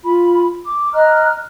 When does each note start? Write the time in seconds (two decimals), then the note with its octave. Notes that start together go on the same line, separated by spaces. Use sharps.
0.04 F4 B5
0.66 D6
0.93 D#5 A#5 F6 F#6